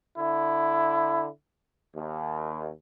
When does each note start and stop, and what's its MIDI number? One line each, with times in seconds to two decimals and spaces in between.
0.18 1.27 50
0.18 1.27 64
1.94 2.69 39